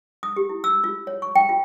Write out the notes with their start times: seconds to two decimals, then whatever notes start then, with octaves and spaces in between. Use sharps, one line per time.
0.23 D#6
0.36 G4
0.49 E4
0.64 E6
0.84 F4
1.07 C#5
1.22 C#6
1.35 G5
1.49 F4